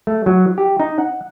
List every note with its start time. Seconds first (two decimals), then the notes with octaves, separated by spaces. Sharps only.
0.07 A3
0.26 F#3
0.58 G4
0.80 D#4
0.98 F#5